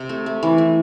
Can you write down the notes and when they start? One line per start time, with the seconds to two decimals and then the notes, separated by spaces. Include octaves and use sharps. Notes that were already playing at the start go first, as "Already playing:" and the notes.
Already playing: C3
0.09 A3
0.26 A3
0.43 E3
0.58 A3